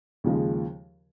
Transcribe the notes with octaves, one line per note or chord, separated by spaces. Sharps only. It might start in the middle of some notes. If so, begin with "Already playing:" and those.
D#2 C#3 F3 G#3